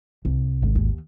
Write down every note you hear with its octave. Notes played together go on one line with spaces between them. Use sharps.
C2
G#1
D#2